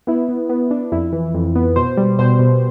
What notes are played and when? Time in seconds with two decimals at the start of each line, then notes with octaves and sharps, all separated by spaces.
0.07 B3 E4
0.29 B3
0.49 B3
0.71 D4
0.92 F2 E4
1.13 E3
1.34 F2
1.56 B3
1.76 B2 C5
1.97 G3
2.19 B2 C5
2.39 B2